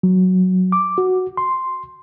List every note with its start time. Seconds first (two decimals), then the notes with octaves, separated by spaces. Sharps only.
0.03 F#3
0.72 D6
0.98 F#4
1.37 C6